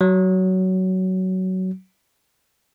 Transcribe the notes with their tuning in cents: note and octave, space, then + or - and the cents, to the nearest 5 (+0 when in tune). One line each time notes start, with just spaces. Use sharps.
F#3 +15